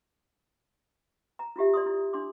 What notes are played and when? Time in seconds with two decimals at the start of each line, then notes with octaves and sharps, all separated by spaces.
1.39 A#5
1.56 E4 F4 G4 E5
1.74 D5 C6 D#6
1.86 E4
2.13 D4 C6 D6